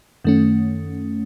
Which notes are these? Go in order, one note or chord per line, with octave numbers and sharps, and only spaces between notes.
F#2 D#3 A3 C#4